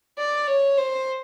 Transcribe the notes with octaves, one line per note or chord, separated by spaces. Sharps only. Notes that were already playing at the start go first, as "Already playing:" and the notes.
D5
C#5
C5